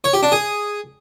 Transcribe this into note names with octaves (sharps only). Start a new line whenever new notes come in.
C#5
G4
D4
G#4